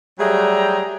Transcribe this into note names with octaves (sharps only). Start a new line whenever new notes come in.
F#3 G3 A3 G#4 G5 A#5